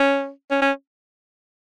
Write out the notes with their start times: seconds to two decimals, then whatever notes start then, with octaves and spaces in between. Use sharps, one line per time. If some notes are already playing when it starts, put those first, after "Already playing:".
Already playing: C#4
0.51 C#4
0.62 C#4